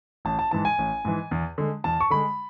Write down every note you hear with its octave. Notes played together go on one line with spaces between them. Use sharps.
A1 A5
A5
G#2 E3 A5
G#5
A1
G#2 E3
E2
D3 G#3
E2 A5
C#6
D3 G#3 B5